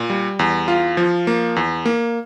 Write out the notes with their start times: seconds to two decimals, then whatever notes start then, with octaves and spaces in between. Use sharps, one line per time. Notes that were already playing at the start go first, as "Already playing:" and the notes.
Already playing: A#2
0.10 G3
0.39 E2
0.68 F4
0.97 F3
1.27 A#3
1.56 E2
1.86 A#3